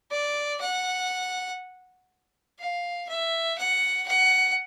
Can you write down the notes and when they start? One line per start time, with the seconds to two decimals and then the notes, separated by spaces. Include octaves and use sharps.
0.11 D5
0.61 F#5
2.59 F5
3.09 E5
3.58 F#5
4.08 F#5